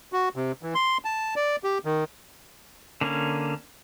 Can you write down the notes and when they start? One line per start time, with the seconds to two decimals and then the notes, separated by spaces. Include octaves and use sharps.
0.13 F#4
0.36 C3
0.63 E3
0.75 C6
1.05 A5
1.36 D5
1.64 G4
1.85 D#3
3.01 D3 A#3 C#4